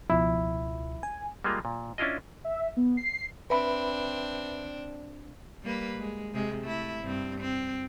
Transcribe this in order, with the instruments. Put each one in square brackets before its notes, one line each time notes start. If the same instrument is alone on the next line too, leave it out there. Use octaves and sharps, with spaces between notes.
[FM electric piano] C#2 B2 F3 [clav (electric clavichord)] E4
[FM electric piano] G#5
[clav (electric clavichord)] G3 G#3 A#3 F4
A#2
C#4 D4 E4 F4 D#5
[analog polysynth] E5
B3
C7
[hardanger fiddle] C4 D4 [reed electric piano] B4 E5 B5
[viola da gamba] G3 A#3 B4
G#3
C3 G#3
A3 E4
G2 C4
C4